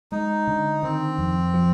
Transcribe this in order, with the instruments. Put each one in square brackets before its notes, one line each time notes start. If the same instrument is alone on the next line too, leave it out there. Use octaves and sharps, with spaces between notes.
[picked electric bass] G#3 [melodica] D#4
[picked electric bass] D3
[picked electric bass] D#3 [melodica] C4
[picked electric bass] F2
F3